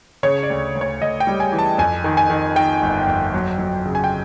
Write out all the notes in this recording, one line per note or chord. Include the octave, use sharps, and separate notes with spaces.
C#3 C#5
D5
D2
D2
C#5
D2 D#5
G5
G3
G#5
E3
A5
F2 G#5
D#3
G#5
D#3
D#3 G5
G1
F2
F#3
F#3
C#3
G#5
G5